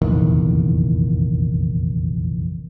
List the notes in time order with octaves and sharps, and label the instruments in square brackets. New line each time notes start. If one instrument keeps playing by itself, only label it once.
[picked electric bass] F1 A#1 E2 D#3